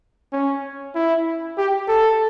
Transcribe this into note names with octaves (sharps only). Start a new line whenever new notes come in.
C#4
E4
G4
A4